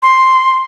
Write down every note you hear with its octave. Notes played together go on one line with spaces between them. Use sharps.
C6